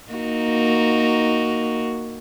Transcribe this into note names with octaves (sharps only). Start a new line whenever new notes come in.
A#3 D#4 F#4